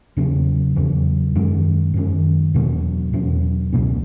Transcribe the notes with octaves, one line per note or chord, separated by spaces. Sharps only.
E2 C#3 F#3 C#4
E2 C#3 F#3 C#4
F#2 D#3 G#3 C#4
F#2 D#3 G#3 C#4
E2 B2 F#3 C#4
E2 B2 F#3 C#4
C#2 B2 A3 C#4